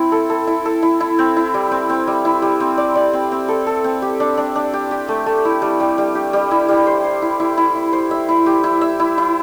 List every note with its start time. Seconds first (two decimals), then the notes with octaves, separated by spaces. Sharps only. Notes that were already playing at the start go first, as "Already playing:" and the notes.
Already playing: C4 E4
0.12 A4
0.30 A4
0.47 E4
0.65 A4
0.83 E4
1.00 E4
1.19 C4
1.36 E4
1.54 G3
1.71 C4
1.89 C4
2.07 G3
2.25 E4
2.42 G3
2.60 C4
2.77 D5
2.95 D5
3.13 C4
3.32 C4
3.49 A4
3.67 A4
3.84 C4
4.02 G4
4.20 D4
4.37 D4
4.55 D4
4.73 G4
4.91 G4
5.08 A3
5.26 A3
5.45 E4
5.62 G3
5.80 G3
5.98 G3
6.15 G4
6.33 G3
6.51 E4
6.68 G3
6.87 C5
7.04 C5
7.22 E4
7.40 E4
7.57 E4
7.76 E4
7.93 C5
8.11 E5
8.29 E4
8.46 G4
8.64 E4
8.81 E5
9.00 E4
9.18 E4